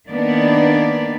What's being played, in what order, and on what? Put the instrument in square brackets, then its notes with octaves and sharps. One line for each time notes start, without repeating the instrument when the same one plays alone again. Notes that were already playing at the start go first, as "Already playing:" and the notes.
[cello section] D#3 A#3 B3 D4 B4 D5